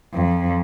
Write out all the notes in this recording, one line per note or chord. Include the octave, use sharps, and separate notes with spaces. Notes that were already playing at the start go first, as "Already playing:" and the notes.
F2